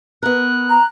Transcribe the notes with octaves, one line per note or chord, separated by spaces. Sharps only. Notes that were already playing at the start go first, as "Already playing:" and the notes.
B3 A#4 F#6
A#5